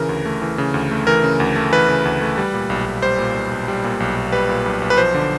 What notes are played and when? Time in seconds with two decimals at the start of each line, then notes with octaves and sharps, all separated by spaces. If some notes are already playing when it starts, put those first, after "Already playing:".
Already playing: C#3 E3 A#4
0.09 D2
0.25 A3
0.42 E3
0.58 C#3
0.74 D2
0.91 A3
1.07 E3 A#4
1.23 C#3
1.40 D2
1.56 A3
1.72 E3 B4
1.88 C#3
2.05 D2
2.21 A3
2.38 G3
2.54 A#2
2.70 B1
2.86 B1
3.02 G3 C5
3.18 A#2
3.34 B1
3.51 B1
3.68 G3
3.84 A#2
4.00 B1
4.17 B1
4.32 G3 B4
4.49 A#2
4.66 B1
4.82 B1
4.90 B4
4.97 F3 C5
5.15 D3